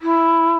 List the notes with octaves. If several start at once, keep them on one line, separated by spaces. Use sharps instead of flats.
E4